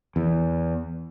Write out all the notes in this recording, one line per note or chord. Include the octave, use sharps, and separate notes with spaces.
E2